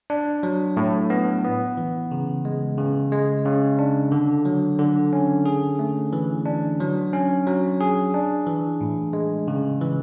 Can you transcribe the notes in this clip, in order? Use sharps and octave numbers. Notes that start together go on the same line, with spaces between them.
D4
F#3
A2
B3
B3
E3
C#3
G#3
C#3
G#3
C#3
D4
D3
F#3
D3
C#4
G#4
A3
E3
D4
F#3
C#4
F#3
G#4
D4
E3
A2
G#3
C#3
E3